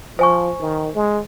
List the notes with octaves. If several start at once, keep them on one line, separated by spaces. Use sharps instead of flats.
F3 C5 G#5 C#6
D#3
G#3